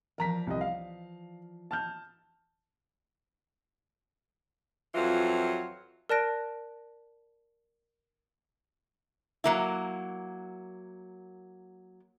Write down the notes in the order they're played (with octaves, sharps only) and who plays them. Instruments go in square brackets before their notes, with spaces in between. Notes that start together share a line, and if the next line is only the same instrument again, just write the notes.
[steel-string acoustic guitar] E3 F3 D5 [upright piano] A#4 A#5 B6
[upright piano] C2 D#5
F5
A5 F6 G6
[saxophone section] F2 E3 F#3 F4 F#5
[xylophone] A#4 D5 A5 F#6 A#6 D7
[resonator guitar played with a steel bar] F#3 A#3 E4